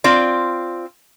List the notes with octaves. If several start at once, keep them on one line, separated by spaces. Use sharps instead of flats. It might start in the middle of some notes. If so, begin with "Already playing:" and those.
C4 F4 D5